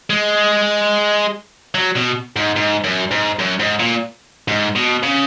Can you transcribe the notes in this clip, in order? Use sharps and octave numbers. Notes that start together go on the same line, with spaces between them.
G#3
F#3
B2
G#2
G#2
F#2
G#2
F#2
G#2
A#2
G#2
B2
C#3